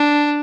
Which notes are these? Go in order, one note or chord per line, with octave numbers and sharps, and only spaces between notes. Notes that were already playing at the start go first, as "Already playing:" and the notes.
Already playing: D4